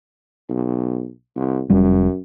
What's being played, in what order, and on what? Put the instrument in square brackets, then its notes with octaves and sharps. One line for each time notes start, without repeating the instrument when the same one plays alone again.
[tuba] B1
C2
[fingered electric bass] F1 G3 C#4 [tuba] F#2